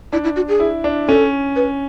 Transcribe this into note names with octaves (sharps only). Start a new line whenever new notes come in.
D4 E4
E4
F#4
G#4
E4
D4
C#4 A4
B4